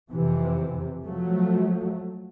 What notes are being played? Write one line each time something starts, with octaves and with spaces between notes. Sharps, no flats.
F2 C3 E3
F3 F#3 A3